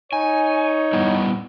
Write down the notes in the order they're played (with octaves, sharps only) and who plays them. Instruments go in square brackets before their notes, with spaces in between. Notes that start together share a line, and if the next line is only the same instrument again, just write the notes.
[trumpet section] D#4 C#5 [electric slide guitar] G#5
[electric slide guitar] G3 B3 E4